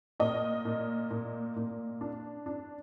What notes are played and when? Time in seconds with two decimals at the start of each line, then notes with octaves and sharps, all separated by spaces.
0.20 A#2 D#5
0.65 A#2
1.11 A#2
1.56 A#2
2.01 D4
2.46 D4